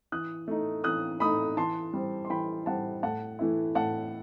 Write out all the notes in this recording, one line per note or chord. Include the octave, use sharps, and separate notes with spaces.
E3 D#6 F#6
A3 D#4
E3 D#6 F#6
A3 D#4 B5 D#6
E3 A5 C6
G3 C4
C6
E3 G5 B5
G3 C4 F#5 A5
A2 F#5 A5
E3 A3 E4
A2 F#5 A5